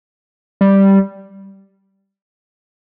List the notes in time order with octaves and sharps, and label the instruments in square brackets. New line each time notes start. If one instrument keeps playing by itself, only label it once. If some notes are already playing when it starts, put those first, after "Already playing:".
[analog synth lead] G3